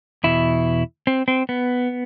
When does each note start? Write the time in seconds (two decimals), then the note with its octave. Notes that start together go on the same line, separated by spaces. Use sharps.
0.24 E2 B2 E4
1.07 C4
1.28 C4
1.49 B3